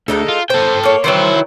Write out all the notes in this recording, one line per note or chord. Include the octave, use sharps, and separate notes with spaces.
D2 G#3 D#4 A4
F4
A4 C5 G5
A#3 C#5
D#3 E3 F#3 E4 C5